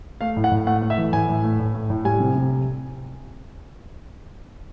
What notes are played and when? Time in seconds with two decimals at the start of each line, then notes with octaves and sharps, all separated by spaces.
0.21 A3 F5
0.36 A2
0.44 F#5
0.51 A2
0.67 A3 F#5
0.82 A3
0.90 E5
0.98 E3
1.13 A2 G#5
1.29 A2
1.44 A3
1.59 A2
1.74 A3
1.90 A2
2.05 G3 G#5
2.20 C3
2.35 C3